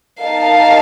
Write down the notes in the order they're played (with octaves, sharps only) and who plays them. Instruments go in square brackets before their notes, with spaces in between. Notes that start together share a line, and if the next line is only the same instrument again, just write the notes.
[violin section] D#4 A#4 F5 A5